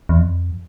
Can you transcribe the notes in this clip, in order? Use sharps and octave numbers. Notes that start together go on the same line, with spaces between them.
E2
F2